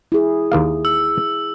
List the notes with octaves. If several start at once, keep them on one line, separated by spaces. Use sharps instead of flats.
E4 G#4
D#2 A#3 F5
E6